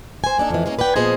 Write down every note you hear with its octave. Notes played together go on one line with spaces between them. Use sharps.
C5 G#5
A#3 D4 D#4 A4
F2 E3
G#3 A#3 C#4
B4 D5 F#5 G5
A#2 F3 B3 G#4 C5 D#5